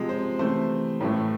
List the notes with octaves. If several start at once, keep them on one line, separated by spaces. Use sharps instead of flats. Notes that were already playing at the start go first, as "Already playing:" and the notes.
Already playing: C3 F3 G#3
C5
C3 E3 A3 C5
A2 E3 A3